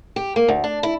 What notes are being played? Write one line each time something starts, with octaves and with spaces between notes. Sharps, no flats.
G4
A#3
D2
D4
E4